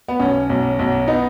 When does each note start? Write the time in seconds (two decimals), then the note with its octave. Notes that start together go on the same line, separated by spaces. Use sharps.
0.08 B3
0.20 B1 C#4
0.50 B1
0.79 B1
1.08 B3 D#4